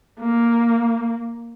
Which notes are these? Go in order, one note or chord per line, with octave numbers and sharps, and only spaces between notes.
A#3